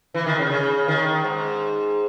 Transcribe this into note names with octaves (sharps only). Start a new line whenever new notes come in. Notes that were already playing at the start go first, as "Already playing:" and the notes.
E3
D#3
C#3
C#3
D#3
G#2